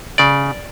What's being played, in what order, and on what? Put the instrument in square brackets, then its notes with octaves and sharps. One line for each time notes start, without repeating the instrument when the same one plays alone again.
[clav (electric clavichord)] C#3 D5